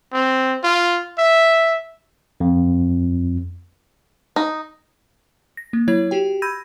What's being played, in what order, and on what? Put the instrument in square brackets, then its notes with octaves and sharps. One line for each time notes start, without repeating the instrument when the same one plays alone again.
[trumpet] C4
F4
E5
[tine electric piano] F2
[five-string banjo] D#4
[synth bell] A#6
A#3
F#3 E4 C#5 G#6
F#4 G4 G5
B5 E6 G6 G#6 A#6 D#7